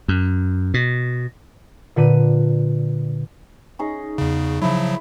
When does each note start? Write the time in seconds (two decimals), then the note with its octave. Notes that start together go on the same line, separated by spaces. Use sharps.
0.08 F#2
0.74 B2
1.96 A#2 D3 B4 D#7
3.79 C#4 D#4 G#4
4.18 E2 C#3
4.62 C#3 F3 F#3 E4